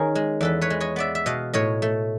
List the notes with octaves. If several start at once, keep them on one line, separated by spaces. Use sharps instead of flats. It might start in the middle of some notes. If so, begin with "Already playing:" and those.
Already playing: D#3 C#4 G#4 A#4
G#3
E2 A4 B4
B4 C#5
G#3
C#5 D#5
B3 D5 E5
E5
B2 D#5 F5
A2 C#5 D#5
A3